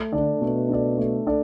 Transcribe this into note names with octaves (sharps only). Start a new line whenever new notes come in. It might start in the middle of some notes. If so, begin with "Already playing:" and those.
Already playing: A3
D3 D4 A4 D5
B2 A3
D4 A4 D5
A3
D4 A4 D5